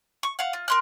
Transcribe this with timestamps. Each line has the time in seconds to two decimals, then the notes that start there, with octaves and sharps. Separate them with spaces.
0.23 C#6
0.39 F5 F#5
0.53 F4
0.68 A#4 C6 F#6